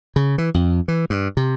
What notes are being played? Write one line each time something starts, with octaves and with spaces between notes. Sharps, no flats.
C#3
E3
F2
E3
G2
C3